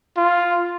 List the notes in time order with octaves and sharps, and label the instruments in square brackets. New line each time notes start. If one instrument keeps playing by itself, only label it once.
[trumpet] F4